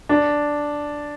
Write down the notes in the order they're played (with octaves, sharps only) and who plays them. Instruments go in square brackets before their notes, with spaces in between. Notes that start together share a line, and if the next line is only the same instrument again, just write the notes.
[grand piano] D4